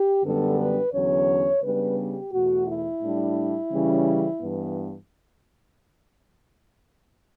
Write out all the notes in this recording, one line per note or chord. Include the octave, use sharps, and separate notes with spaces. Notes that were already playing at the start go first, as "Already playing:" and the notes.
Already playing: G4
F#2 D3 G3 B3 D4 A4
B4
E2 D3 F#3 C#4 C#5
C#3 G3 B3 D4 B4
G4
E2 B2 A3 F#4
E4
A2 G3 D4
C#3 E3 G3 C#4
G2 E3 B3